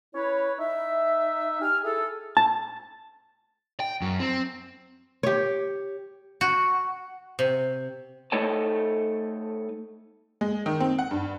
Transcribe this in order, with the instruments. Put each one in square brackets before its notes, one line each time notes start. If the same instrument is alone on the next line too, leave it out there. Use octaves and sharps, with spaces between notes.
[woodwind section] C#4 E4 B4 C#5
D#4 E5
G4 G#5 F6
E4 G#4 A4
[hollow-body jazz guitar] A5
[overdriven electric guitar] G5
F#2
C4
[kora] G4 C#5
[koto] F#4
C3
[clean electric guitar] A3 D#4 A4 C#5 A5
[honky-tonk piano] G#3
D#3
C4
F#5
G2